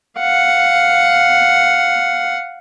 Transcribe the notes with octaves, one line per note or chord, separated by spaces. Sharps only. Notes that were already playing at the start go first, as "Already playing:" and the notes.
F5 F#5